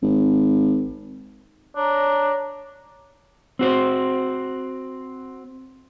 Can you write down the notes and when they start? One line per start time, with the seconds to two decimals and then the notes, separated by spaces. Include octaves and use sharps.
0.03 G#1
1.76 D4 C#5 A#5
3.59 C4 F#4 C5